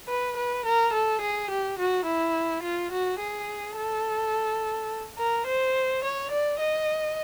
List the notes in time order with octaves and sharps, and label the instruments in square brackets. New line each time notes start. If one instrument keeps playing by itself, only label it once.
[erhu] B4
B4
A#4
A4
G#4
G4
F#4
E4
F4
F#4
G#4
A4
A#4
C5
C#5
D5
D#5